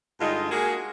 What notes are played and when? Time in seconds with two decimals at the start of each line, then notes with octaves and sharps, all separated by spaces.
0.20 G2 D3 G#3 D#4 F4
0.51 G#3 A#3 F#4 G#4